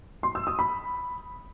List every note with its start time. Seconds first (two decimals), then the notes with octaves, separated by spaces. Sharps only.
0.23 C6
0.35 E6
0.47 D#6
0.59 B5